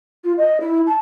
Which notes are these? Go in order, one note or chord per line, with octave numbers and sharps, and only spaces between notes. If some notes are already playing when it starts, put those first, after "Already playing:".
F4
D#5
E4
A5